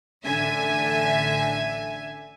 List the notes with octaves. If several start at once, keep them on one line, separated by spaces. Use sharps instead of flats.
A1 D3 E5 G#5